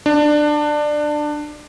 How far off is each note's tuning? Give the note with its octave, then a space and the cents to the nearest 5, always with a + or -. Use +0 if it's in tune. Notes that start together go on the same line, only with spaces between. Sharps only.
D4 +20